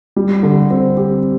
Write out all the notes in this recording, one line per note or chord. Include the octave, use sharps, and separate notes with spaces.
G3
D3
C4
G4